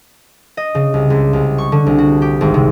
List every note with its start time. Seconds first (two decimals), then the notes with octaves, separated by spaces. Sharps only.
0.57 D#5
0.75 C#3
0.94 C2
1.10 C#2
1.33 C2
1.58 C#6
1.72 D3
1.86 C2
1.98 F#4
2.22 G4
2.41 G#1
2.54 C3